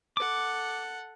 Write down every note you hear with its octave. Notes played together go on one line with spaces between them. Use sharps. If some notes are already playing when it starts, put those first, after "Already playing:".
A4 F#5 D6